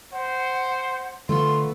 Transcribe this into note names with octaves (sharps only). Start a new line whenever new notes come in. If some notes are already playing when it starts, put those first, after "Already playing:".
C5 F#5
D3 A3 B3 F4 C6